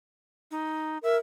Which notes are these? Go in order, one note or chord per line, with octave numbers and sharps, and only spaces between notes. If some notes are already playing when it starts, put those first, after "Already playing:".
D#4
A#4 E5